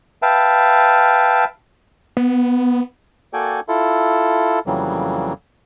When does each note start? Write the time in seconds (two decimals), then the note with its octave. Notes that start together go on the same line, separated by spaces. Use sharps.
0.22 B4 E5 F5 G5 A5
2.17 B3
3.33 A#3 F#4 A4 D5 G5 G#5
3.68 E4 F4 A4
4.67 F2 C#3 E3 F#3 G3 A#3